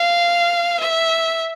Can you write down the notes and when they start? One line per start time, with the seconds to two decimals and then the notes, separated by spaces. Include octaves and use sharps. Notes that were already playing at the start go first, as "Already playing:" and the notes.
Already playing: F5
0.80 E5